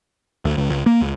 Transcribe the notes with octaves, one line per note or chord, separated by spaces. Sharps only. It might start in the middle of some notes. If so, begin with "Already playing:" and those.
D2
C#2
C#2
A#3
C#2